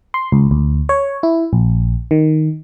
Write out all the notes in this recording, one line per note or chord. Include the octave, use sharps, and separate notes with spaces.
C6
C#2
D2
C#5
E4
A#1
D#3